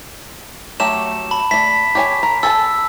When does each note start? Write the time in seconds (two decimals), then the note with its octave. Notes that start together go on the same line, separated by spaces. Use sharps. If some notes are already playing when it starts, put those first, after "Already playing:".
0.80 F#3 A3 G4 E7
1.31 A5 B5
1.51 A3 D5 B6
1.95 G4 C#5 G#5
2.23 A#4
2.43 A4 G#5 A5 E6